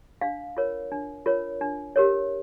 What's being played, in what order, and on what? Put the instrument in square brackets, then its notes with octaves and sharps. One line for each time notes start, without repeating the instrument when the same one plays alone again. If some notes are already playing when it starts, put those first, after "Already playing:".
[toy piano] D4 F5
F4 A#4 C#5
D4
F4 A#4 C#5
D4
G4 A#4 C#5